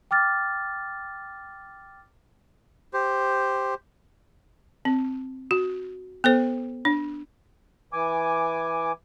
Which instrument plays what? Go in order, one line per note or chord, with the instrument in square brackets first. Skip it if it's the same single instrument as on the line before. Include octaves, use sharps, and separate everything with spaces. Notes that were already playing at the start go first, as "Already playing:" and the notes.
[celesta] G5 D6 F6 A6
[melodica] G4 C5
[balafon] C4
F#4
B3 A4 C5
D4
[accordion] E3 G#5 D6